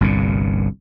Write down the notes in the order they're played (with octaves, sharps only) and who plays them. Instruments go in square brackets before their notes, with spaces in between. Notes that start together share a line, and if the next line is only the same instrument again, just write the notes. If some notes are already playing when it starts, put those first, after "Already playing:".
[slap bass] G1 C2 G2 A#2